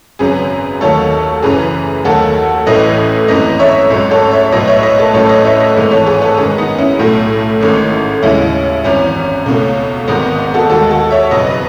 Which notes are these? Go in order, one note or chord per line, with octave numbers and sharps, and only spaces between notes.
G#1 F#2 C#3 F#3 G#4 B4
D#2 D#3 F#3 A3 A4 C#5
F#1 F#2 E3 G#4 B4
D#2 D#3 F#3 A3 F#4 A4
A1 A2 E3 A3 B4 D#5
G#1 F#2 E3 A3 B4 D#5
C#5 E5
A1 G#2 F#3
A4 C#5
C#5 E5
B1 A2 F#3 B4 D#5
C#5 E5
B4 D#5
A4 C#5
A1 A2 F#3 A3 A4 C#5
B4 D#5
C#5 E5
B4 D#5
G#1 G#2 E3 A3
A4 C#5
G#4 B4
A4 C#5
F#2 D#3 G#3 G#4 B4
B3 D#4
C#4 E4
B1 A2 F#3 A3
A1 G#2 D#3 A3
D#2 C#3 G#3 C#4 E4
G#1 F#2 E3 C#4
C#2 B2 A3
G#1 G#2 D#3 B3 D#4
B3
F#4 A4
D#2 D#3 G#3 F#4 A4
F#4 A4
C#5 E5
F#1 E2 B2 F#3 B4 D#5
B4 D#5